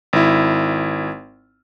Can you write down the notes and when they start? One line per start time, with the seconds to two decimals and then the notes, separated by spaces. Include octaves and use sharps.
0.13 G#1 E4